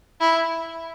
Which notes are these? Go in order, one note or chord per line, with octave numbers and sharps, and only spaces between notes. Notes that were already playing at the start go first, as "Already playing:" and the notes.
E4